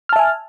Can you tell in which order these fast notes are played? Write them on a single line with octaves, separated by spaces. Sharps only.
F6 A5 E5 G#5